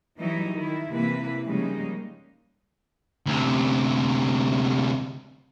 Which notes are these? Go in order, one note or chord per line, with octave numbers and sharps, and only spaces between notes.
E3 F#3 G3 D#4 E4
D#3 E4
C3 E3 G3 A#3 E4 B4
C#3 F3 G3 G#3 A#3 D#4
D2 C3